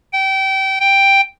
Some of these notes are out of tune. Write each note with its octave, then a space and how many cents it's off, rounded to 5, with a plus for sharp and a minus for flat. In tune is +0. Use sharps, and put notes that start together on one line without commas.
G5 -25
G5 +5